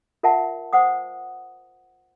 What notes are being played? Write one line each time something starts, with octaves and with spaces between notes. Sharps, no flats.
F4 A#4 E5 F#5 A5
C5 F#5 D#6